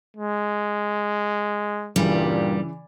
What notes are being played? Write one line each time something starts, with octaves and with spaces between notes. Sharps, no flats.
G#3
G2 A#2 C#3 E3 G3